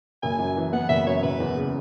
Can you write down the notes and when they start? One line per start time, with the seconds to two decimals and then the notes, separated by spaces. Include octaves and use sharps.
0.23 F#1 G#5
0.39 F#2
0.57 E3
0.73 B3 F#5
0.89 F#1 E5
1.06 F#2 C#5
1.23 F#1 B4
1.40 E2
1.56 C#3